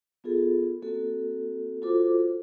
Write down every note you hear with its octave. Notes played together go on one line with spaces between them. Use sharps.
B3 F4 G#4 A4
A#3 C4 F#4 A4
F4 F#4 A4 C5 D6